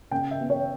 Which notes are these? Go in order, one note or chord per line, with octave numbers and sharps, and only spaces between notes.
C#3 G5
E5
B3
C#5